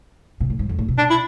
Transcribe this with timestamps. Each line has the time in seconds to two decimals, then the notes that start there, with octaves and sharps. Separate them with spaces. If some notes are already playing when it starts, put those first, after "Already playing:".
0.40 B2
0.50 A2
0.59 G#2
0.69 F2
0.79 A2
0.88 B2
0.98 D4
1.10 E4